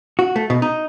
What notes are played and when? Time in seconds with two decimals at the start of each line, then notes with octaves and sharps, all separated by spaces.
0.19 F#4
0.36 A3
0.50 B2
0.62 D#4